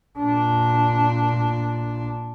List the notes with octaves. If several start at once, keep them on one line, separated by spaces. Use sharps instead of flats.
A#2 D4